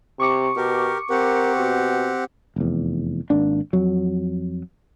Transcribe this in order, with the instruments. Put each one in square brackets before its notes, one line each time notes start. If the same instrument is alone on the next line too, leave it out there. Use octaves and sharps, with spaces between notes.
[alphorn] C3 [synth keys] C#6 D6 C#7
[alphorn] B2 [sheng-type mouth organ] G4 A#4
[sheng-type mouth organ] C4 G4 F#5 [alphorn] A#4
[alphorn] B2
[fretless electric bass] F1 E2
G#1 A#3 D4
F2 F#3